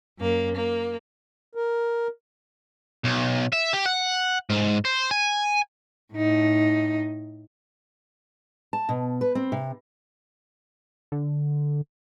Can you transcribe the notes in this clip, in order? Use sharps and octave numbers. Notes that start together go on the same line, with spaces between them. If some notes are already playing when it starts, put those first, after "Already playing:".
F#2 A#3
A#3
A#4
B1
E5
G4
F#5
G#2
C5
G#5
A2 D#4
A5
B2
B4
C4
C3
D3